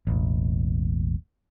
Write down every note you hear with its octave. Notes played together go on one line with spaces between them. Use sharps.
E1 A1